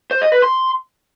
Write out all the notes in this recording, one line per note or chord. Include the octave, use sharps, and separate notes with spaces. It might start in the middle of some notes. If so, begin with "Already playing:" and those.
C5
D#5
B4
C6